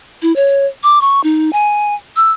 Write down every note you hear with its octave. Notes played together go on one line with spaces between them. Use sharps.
E4
C#5
D6
C#6
D#4
G#5
E6